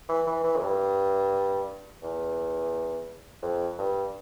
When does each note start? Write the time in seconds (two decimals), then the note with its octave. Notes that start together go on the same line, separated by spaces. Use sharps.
0.09 E3
0.27 E3
0.44 E3
0.56 F2
0.62 G2
2.03 E2
3.42 F2
3.79 G2